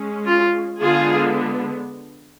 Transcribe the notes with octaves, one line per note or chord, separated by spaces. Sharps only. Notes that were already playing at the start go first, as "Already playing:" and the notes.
Already playing: G#3 C#4
F4
D3 G#3 B3 D4 F4 G#4